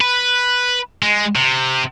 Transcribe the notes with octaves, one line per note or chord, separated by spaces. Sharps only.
B4
G#3
C3